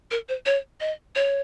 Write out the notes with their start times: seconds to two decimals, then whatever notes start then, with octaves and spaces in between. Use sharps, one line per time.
0.11 A#4
0.29 C5
0.46 C#5
0.80 D#5
1.16 C#5